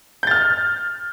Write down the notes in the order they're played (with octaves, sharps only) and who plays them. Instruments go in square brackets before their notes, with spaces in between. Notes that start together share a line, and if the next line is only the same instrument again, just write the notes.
[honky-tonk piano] G6
A6
F6